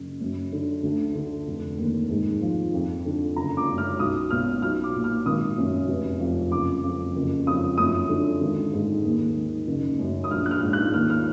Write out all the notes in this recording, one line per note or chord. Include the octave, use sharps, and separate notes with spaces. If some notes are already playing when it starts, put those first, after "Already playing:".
Already playing: F#1
F#2
D3
D2
D3
F1
D#2
G#2
F3
F2
D3
F#1 A#5
D6
F#2
F6
B1 D#6
B2 F6
B1 F6
D6
A#2
F6
G#1 D#6
F#2
F1
F2
F#1 D6
F2
F#1
F2 D#6
F#2 D#6
D3
G#1
G#2
D#2
D#3
F#1
F#2
D#6
A#1 F6
F#6
F6
G#2
F#6
D#2 F6
F6